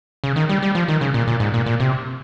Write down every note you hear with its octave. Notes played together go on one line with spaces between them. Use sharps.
C#3
D#3
G3
G3
F3
D#3
C#3
A#2
A#2
G#2
A#2
A#2
C3